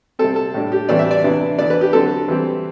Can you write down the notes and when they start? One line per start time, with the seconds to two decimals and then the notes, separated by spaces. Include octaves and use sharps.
0.19 C3 G3 C4 A4
0.36 A4
0.54 A2 G3 D4
0.72 G4
0.89 A2 E3 G3 C4 D5
0.99 E5
1.11 D5
1.23 C3 E3 B3 D4
1.58 E3 B3 D4 D5
1.70 B4
1.81 G4
1.93 D3 F#3 C4 A4
2.28 E3 G3 C4